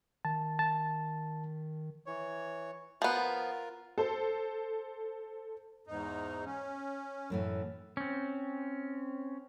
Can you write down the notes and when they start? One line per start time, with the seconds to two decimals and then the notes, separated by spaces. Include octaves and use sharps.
0.25 D#3 A5
0.59 A5
2.06 E3 C#5
3.02 F3 B3 F4 A#4
3.98 A4 C5
5.87 E2 G#2 D#4
6.45 C#4
7.30 F#2 A2 E3
7.97 C4 C#4